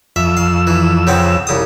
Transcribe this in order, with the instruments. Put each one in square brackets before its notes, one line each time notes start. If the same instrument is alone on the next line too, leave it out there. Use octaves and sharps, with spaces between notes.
[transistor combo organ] F2 E6 [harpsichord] E5
[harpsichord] F5
E3
C#3 B3 C4
C2 C#3 D#6